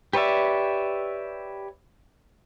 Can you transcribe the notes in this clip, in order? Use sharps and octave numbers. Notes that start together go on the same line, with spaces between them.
G4 B4 C#5 D5 E5